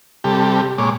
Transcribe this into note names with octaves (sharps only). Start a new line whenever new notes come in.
C3 G3 G4 A4
A#2 G#3 C#5 D6